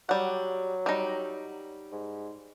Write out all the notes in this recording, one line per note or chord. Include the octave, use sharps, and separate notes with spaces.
F#3 G3 F#5
G3 D#4
G#2